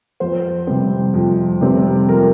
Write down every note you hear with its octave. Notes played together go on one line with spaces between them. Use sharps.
F2 C5
C3 G3 C4
F2
C3 G3 C4
F2 A#4